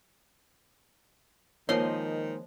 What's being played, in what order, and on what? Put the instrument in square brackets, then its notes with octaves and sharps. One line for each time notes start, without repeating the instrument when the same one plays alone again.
[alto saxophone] D#3 [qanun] F3 D#5 C6 [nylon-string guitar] G#3 A#3 C4 [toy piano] C#5